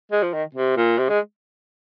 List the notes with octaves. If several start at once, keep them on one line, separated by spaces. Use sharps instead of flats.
G#3
F3
D#3
C3
A#2
C3
G#3